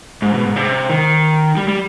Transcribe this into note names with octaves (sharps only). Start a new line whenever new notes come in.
G#2
B2
G#2
C3
D#3
G3
G3